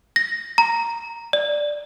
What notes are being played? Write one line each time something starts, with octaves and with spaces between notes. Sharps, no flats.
A#6
A#5
D5